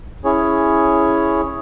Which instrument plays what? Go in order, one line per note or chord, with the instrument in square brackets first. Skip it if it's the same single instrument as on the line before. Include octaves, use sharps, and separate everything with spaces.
[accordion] C#4 E4 G#4 C#5